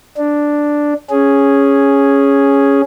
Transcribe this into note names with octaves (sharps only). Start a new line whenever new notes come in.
D4
C#4 G#4